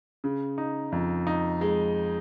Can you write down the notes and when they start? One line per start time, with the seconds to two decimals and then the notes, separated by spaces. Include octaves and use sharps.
0.24 C#3
0.58 D#4
0.92 F2
1.27 D#4
1.61 G#3